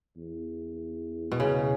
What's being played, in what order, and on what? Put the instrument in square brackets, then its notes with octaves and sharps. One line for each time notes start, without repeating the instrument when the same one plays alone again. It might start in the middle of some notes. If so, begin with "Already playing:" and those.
[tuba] E2
[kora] B2
C#3